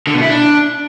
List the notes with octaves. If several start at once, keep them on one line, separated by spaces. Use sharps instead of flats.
D3
B2
E4
D4